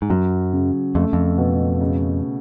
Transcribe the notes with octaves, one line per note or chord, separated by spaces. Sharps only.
G#2
F#2 F#3
C#3
F2 A3
F2
B2
C#3